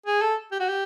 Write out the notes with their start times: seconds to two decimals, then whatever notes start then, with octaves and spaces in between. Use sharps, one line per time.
0.06 G#4
0.21 A4
0.52 G4
0.60 F#4
0.68 G4